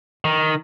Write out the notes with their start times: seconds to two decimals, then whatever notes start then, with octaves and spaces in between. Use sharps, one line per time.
0.25 D#3